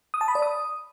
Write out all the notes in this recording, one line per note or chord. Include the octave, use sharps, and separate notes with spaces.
D#6
A5
B5
D5
D#6